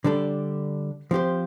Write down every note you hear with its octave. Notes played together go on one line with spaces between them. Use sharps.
D3 G3 D4 A4
F3 C4 G4 C5